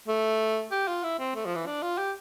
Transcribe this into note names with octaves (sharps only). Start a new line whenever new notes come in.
A3
G4
F4
E4
C4
A3
F3
E3
D4
F4
G4